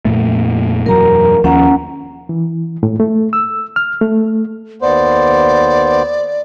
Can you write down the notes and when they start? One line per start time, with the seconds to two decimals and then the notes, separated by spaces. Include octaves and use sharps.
0.05 F2 A#2 A3
0.86 E1 F#2 F#3 A#4 A#5
1.44 D#2 F3 C#4 F#5 A#5
2.29 E3
2.83 A2
3.00 A3
3.33 E6
3.76 F6
4.01 A3
4.82 D#2 B3 C5 D5